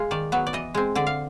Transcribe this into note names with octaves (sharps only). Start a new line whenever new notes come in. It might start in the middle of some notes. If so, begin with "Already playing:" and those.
Already playing: G#3 F4
D#3 D5
F#3 B3
D5
E3 D#5
G#3 C4
D3 D5
F5